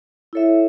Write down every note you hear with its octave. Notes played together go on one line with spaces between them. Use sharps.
E4 A4 C#5 E5